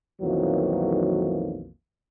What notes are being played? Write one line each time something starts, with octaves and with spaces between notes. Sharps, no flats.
B1 F2 D#3 E3 F#3 A#3